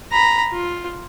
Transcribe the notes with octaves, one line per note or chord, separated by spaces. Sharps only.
A#5 B5
F4